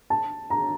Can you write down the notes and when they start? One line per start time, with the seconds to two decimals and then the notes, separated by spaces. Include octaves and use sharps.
0.10 A5
0.50 A#5